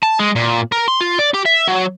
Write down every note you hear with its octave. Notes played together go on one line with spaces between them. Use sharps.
A5
G#3
A#2
A#4
C6
F4
D5
G4
E5
F#3